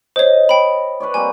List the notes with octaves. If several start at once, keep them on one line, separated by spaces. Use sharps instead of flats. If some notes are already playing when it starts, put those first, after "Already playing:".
C5 C#5 D#5
G5 B5
B4 C#5 D5
G3 A#3 C4 G#5